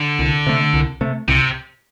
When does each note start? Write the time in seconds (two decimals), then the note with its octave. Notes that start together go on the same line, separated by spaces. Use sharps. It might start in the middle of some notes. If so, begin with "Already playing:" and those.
Already playing: D3
0.19 C2
0.47 C3 A3
0.74 C2
1.01 C3 A3
1.28 C2 C3